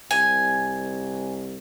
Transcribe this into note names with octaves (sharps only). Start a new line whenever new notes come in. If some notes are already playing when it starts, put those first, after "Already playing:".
C2 G#5